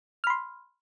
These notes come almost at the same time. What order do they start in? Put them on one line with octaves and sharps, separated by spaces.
F6 B5 C6